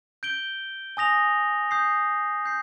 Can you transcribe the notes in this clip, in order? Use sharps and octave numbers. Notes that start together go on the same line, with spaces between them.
G6 D7 G7
G#5 D#6 A#6 F7
D#6 G6 C7
G6 C7